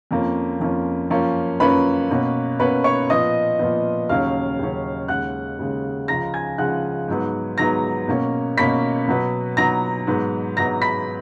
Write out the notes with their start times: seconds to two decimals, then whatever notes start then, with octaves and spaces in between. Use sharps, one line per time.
0.11 F2 F3 A#3 C#4
0.60 F2 F3 A#3 C#4
1.10 F#2 F3 A#3 C#4
1.60 F#2 F3 A#3 C#4 B4 B5
2.10 B2 A#3 C#4
2.60 B2 A#3 C#4 B4 B5
2.84 C#5 C#6
3.10 A#2 F3 B3 D#5 D#6
3.59 A#2 F3 B3
4.09 D#2 C#3 F#3 C#4 F5 F6
4.59 D#2 C#3 F#3 C#4
5.08 D#2 C#3 G#3 F#5 F#6
5.59 D#2 C#3 G#3
6.08 C#2 C#3 F3 G#3 A#5 A#6
6.34 G#5 G#6
6.58 C#2 C#3 F3 G#3 F#5 F#6
7.08 G#2 F#3 B3
7.58 G#2 F#3 B3 A#5 A#6
8.08 B2 A#3 C#4
8.57 B2 A#3 C#4 B5 B6
9.08 B2 F#3 B3
9.57 B2 F#3 B3 A#5 A#6
10.07 G#2 F#3 B3
10.56 G#2 F#3 B3 A#5 A#6
10.82 B5 B6